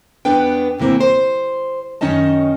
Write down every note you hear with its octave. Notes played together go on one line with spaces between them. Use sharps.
E2 B3 D4 B4 G5
D#2 C3 E3 A#3 C4
C5
F#2 D#3 C#4 D#4 D#5 A5